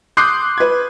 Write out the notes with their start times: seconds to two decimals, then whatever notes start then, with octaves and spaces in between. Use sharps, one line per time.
0.17 C6 D6 D#6 F#6 G6 C7
0.58 B4 G#6